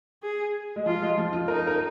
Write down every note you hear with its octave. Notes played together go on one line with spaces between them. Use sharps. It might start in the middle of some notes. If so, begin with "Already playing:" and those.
G#4
G#3
F3 F4
G#3
F3
F4
D#4 A#4
A#4